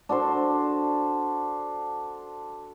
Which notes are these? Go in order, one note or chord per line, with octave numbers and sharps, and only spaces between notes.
D4 F#4 A4 C5